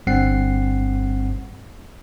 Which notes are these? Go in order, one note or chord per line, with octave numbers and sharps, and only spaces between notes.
G1 G2 G3 C4 F#5 C7